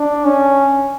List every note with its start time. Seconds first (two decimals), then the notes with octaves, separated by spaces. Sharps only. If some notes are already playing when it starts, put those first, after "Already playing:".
Already playing: D4
0.25 C#4